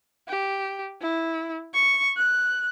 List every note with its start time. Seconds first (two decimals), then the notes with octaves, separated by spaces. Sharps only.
0.28 G4
1.01 E4
1.74 C#6
2.17 F#6